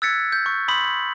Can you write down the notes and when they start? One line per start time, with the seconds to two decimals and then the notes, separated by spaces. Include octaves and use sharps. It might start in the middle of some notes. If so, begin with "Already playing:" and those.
0.02 E6 F#6 G#6 A6 B6 C#7
0.32 G6
0.46 C#6
0.68 B5 C6 D#6 G6 B6 F#7